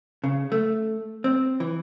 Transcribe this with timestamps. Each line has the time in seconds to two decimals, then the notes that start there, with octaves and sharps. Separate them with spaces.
0.24 C#3
0.52 A3
1.24 C4
1.60 E3